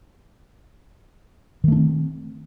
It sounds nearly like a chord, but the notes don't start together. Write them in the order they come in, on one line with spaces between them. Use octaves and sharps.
D#3 A3 D4 C4